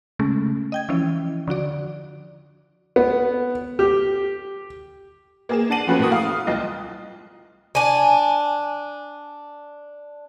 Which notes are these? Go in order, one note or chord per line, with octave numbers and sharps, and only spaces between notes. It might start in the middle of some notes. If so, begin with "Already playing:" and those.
C#3 G#3 A3 C#4
D#5 G5 G#6
E3 F3 C#4 E4
D3 F3 F#4 D5
B3
G4
A#3 G#4 E7
D4 F#5 A5 C7 D#7 F#7
F3 A3 B3 C#4 F#4 B4
A2 A#3 F#4 D#6
F5 D#6
C2 F4 D#5 G5 D#6
D4 G#5